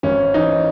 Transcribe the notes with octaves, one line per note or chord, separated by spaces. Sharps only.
G#1 C#4
E3 D#4